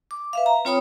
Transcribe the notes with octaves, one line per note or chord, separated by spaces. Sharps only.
D6
B4 E5 F5
A#5
C4 F4 C#5 G5 B5 D#6